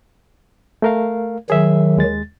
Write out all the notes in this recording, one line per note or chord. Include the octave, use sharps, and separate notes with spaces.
A3 A#4 F5
D#3 F#3 G#4 E5
D#2 G#3 A6